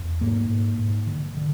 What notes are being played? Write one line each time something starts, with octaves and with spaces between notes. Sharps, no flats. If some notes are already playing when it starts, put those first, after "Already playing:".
Already playing: E2
G#2 A#3
G#2
G#2
D3
D3